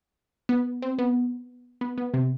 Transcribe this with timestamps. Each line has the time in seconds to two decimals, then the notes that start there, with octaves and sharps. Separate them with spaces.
0.49 B3
0.82 C4
0.99 B3
1.81 B3
1.98 B3
2.14 C3